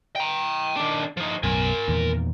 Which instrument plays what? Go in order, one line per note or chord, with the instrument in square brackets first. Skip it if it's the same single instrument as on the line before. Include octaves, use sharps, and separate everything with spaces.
[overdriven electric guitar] G5 A#5
D#3 D4
F3 D#4
[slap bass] B1 F#2 [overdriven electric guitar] A#4 G#5
[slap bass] E2 A#2 D#3